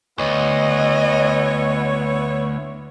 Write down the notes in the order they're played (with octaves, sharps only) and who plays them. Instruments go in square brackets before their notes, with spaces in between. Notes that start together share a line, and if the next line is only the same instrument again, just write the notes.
[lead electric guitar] D2 [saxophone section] B3 E4 C#5 [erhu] D#5